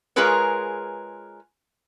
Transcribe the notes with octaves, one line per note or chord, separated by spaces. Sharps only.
G#3 F4 G#4 A#4 B4 C#5